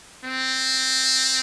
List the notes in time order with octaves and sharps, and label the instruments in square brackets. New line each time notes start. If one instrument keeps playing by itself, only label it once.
[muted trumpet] C4